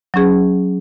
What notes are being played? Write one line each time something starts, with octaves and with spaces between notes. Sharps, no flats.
F#3 C#4 G#4